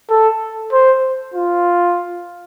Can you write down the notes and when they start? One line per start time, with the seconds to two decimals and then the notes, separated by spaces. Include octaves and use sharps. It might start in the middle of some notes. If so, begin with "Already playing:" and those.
0.10 A4
0.73 C5
1.34 F4